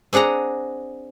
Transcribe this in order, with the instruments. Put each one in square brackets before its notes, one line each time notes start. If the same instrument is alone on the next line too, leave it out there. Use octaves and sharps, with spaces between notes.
[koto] C4 D4 G#4 F#5 A#5